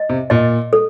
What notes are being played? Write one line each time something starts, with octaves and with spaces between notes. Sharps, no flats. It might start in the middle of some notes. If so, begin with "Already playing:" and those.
Already playing: D#5
C3
A#2 D#5
A4